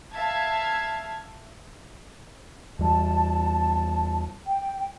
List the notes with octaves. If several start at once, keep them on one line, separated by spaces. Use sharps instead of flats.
E5 F5 A5 G#6
E2 G3 A5
G5